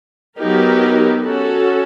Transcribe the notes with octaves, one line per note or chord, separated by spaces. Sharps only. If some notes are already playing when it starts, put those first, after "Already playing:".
F#3 B3 D#4 G4 A#4
C#4 F#4 A4